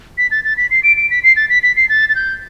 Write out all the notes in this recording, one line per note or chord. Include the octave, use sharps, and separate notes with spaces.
B6
A6
A6
B6
C7
D7
D7
B6
C7
A6
B6
B6
C7
A6
A6
G6